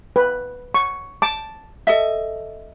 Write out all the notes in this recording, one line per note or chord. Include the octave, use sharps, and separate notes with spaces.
B4
C#6
A5 D6
A4 D#5 E5